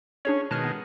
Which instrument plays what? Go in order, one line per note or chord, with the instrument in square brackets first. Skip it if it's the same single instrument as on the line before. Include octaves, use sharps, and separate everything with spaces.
[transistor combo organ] C#4 [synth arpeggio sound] D4 G#4 C#5
[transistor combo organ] B2 D#3 G#3 [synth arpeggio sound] A5 F6
[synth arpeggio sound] B3